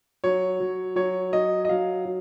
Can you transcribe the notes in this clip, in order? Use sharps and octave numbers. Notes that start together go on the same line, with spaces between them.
F#3 C#5
F#3
F#3 C#5
F#3 D#5
D#5
F#3 F5
F#3